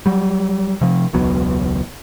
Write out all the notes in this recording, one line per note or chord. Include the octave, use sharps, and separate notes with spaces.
F#3 G3
C3 F3
E1 C#2 F#3 B3